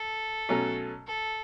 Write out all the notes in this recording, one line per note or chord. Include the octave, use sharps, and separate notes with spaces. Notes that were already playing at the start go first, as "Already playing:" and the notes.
Already playing: A4
B2 F#3 A3 C#4
A4